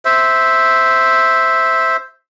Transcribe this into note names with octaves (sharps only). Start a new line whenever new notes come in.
C5 E5